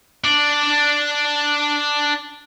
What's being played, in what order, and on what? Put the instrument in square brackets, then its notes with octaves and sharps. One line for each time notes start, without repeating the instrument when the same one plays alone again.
[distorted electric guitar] D4 D5